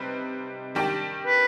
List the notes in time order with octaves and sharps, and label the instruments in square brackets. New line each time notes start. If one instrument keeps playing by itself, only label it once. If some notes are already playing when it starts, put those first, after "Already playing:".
Already playing: [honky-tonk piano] C3 G3 C4 D#4 B4
D#3 G3 D4 G4
[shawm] B4